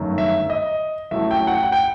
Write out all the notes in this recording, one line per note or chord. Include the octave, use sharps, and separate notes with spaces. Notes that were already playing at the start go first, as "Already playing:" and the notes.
Already playing: G1 F#2 D#3 A3
E5
D#5
A1 A2 F#3 A3 E5
G5
F#5
G5
F#5
G5